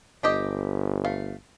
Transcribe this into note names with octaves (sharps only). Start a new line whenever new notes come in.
G1 D4 G4 D#5
A3 F5